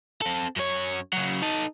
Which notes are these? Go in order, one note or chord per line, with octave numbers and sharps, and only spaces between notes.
C4 A4
F#2 C#5
C#3 F#3
D#4 A4